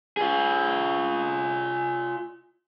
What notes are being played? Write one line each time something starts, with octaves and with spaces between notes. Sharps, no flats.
F4 G#4